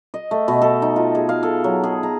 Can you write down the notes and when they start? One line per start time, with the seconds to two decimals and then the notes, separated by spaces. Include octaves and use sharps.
0.14 D#5
0.31 A3
0.48 B2
0.62 A4
0.82 D#4
0.96 F4
1.15 G#4
1.29 F5
1.43 A4
1.64 F#3
1.84 G#4
2.03 A#5